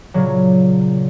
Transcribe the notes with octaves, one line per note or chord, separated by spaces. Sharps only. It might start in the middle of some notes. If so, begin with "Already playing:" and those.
A#2 C#3 F#3